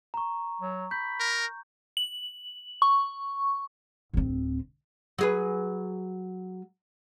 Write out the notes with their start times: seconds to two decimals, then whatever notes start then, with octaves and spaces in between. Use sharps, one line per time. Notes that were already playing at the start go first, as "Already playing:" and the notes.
0.14 A#5 C#6
0.61 F#3
0.91 B5 G6
1.20 A#4
1.97 F#7
2.82 C#6
4.13 D1 C4
5.19 F#3 G#4 B4